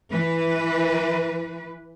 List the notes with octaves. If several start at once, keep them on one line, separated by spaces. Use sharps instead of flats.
E3 B4